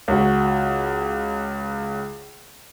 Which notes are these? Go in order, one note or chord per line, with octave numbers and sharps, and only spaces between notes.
C#2 F#4